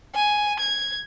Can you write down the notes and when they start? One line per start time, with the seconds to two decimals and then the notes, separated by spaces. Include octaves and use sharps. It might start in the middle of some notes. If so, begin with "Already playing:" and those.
0.15 G#5
0.59 G#6